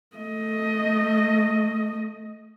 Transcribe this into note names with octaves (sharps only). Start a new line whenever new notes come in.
A3 D#5